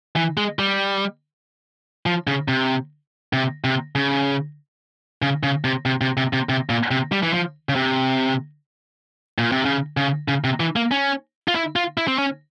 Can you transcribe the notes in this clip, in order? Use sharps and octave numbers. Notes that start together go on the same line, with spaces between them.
E3
G#3
G3
F3
C#3
C3
C3
C3
C#3
C#3
C#3
C3
C3
C3
C3
C3
C3
A#2
C3
G3
E3
F3
C#3
C3
A#2
C3
C#3
C#3
C#3
C3
E3
A#3
C#4
F4
E4
F4
E4
C4
C#4